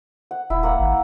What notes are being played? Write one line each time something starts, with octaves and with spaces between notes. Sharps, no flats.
F#5
D#1 E4
A#3 F#5
G#1